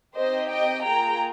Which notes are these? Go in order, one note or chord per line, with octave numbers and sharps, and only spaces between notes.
C4 D#4 G4 C5 D#5
D#5 G5
A#3 F4 G#4 G5 A#5